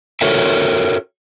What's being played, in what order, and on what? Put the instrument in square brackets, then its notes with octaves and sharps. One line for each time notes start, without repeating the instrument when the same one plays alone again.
[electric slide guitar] F#4 A4 A#4 C#5 E5 G5